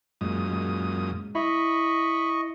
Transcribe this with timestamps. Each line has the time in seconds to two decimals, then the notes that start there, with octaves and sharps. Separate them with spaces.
0.21 F#2 A#2 G#3 D#6
0.50 G#3
1.35 E4 D#5 B5 C#6